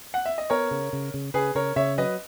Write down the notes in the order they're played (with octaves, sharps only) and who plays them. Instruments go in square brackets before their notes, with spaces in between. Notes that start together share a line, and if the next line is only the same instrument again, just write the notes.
[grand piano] F#5
E5
D#5
[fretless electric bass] B3 [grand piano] A#4 C#5
[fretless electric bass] C#3
C#3
C#3
[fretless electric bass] C#3 [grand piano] G#4 B4
[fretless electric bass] C#3 [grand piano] A#4 C#5
[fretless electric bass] C#3 [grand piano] C#5 E5
[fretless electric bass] F#3 [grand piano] B4 D#5